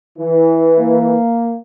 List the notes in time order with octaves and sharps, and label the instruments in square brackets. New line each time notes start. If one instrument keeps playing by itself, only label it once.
[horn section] E3
[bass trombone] A#3